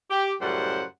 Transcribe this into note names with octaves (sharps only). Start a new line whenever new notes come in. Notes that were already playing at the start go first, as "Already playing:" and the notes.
G4
F#2 A2 C#3 G3 C5 F#5